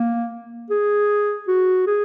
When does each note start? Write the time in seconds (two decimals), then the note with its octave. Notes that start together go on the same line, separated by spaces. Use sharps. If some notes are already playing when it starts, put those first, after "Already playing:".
Already playing: A#3
0.70 G#4
1.48 F#4
1.86 G#4